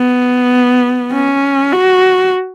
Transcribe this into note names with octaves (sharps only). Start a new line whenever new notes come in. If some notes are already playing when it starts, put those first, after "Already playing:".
Already playing: B3
C#4
F#4